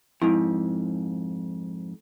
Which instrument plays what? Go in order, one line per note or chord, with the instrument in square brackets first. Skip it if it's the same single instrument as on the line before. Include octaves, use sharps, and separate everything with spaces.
[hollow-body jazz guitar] F2 G#2 [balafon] E4